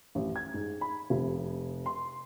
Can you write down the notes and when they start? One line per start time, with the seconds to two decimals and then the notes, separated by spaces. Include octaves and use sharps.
0.15 A1
0.36 G#6
0.54 G#2
0.81 B5
1.10 F1
1.86 C6